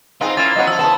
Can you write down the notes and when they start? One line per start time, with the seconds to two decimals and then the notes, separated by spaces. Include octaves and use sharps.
0.21 C4 D#4 F4 G#4 B4 G5
0.37 A#3 C#4 E4 A6
0.56 F#3 B3 C#4 D#5 F#5
0.67 F3 F4 E6
0.79 C#3 E3 B3 C5 A5